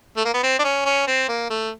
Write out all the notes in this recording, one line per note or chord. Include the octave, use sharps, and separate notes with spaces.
A3
A#3
B3
C4
D4
C#4
C#4
C4
A#3
A3